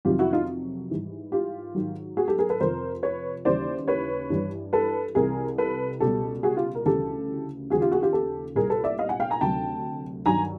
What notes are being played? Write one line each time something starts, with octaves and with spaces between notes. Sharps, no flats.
F2 C3 D#3 F#3 F4 G4
E4 F#4
D#4 F4
G#2 E3 G3
F4 G4
G#2 D#3 F#3
F#4 G#4
G4 A4
G#4 A#4
A4 B4
F2 C3 F3 A#4 C5
B4 C#5
D#2 C#3 E3 G3 C5 D5
B4 C#5
G2 E3 G3
A4 B4
C2 C3 E3 G3 G#4 A#4
A4 B4
C#2 B2 G3 G4 A4
F#4 G#4
F4 G4
A#4
D2 C#3 E3 G3 G4 A4
D#2 C#3 F3 F#4 G#4
F4 G4
F#4 G#4
F4 G4
G4 A4
C2 A#2 G3 G#4 A#4
A4 B4
D5 E5
D#5 F5
F#5 G#5
F5 G5
G#5 A#5
D2 C3 D#3 F#3 G5 A5
G2 D#3 F#3 G#5 A#5